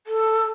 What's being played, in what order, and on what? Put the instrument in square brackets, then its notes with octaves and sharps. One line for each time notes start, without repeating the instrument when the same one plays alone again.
[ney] A4